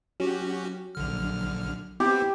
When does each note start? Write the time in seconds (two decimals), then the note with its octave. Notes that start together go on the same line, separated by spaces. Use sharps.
0.20 F#3 C#4 F#4 G4
0.95 A#1 D3 F6
2.00 B3 C4 E4 G4